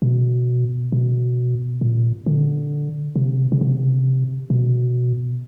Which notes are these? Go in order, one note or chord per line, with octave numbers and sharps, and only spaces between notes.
B2
B2
A#2
D3
C3
C#3
C3
B2